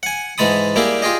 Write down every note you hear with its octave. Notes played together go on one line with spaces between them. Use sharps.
F#5 G#5
G#2 E3 G#3 A5 B5 D#6
G3 A#3 E4 G4 G#4
F4 G4 G#4 D#5